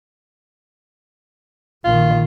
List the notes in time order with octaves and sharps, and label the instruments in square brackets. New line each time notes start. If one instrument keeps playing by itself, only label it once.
[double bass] A#1 D#3 [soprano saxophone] F4